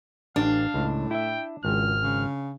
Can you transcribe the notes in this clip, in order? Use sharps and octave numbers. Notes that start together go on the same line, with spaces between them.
A1 D4 F5
C#2 A2
E4 E5 G5
G#1 C#2 F6
C#3